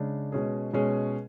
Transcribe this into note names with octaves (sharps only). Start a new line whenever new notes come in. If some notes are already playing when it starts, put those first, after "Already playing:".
Already playing: C#3 G#3 D4
B2 G#3 C#4 G#4
B2 G#3 C#4 G#4